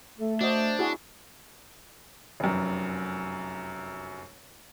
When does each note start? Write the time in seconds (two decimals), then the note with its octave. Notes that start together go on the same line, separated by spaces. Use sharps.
0.19 A3 A4
0.41 D4 F#4 C5 D#5
0.79 E4 F#4 G#4
2.40 F1 F#2